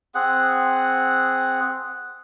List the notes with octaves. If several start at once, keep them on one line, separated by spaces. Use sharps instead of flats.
C4 G#4 F#5